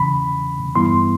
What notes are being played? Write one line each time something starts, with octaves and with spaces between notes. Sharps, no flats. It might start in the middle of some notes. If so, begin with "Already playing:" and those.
Already playing: E2 C#3 E3 B5
G2 E3 G3 B3 E4 C6